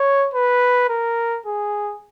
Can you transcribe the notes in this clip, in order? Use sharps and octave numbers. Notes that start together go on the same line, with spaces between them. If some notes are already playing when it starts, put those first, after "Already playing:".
Already playing: C#5
B4
A#4
G#4